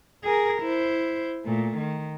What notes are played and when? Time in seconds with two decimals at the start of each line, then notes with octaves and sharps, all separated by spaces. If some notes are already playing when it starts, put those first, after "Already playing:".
0.24 G#4 A#4
0.62 E4 C5
1.45 A#2 A3
1.77 D#3